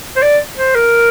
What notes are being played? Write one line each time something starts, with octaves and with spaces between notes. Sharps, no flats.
C5
D5
C5
A#4